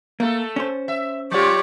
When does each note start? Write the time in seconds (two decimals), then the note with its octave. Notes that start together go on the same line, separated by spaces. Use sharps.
0.20 A3 A#3 A4
0.56 C#4 C5
0.88 E5
1.32 F#3 F4 G4 C#5 D5